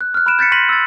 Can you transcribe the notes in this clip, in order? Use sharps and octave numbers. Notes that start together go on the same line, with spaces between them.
F#6
F6 F#6
B5 F6 F#6 D7 E7
G6 A6 B6 C#7
C6 A#6 B6 D#7 F#7
E6 A6